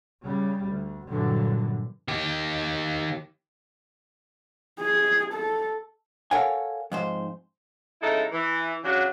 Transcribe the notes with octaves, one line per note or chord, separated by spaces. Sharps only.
C#3 G3
D2
G2 A#2 D3 E3 F#3
D#3 G4
G#4
A4
A4 A#4 C#5 F5 F#5 G#5
F2 G#2 C5
C#3 G#3 D#4 E4 A4
E3
C#3 F#3 D4 F#4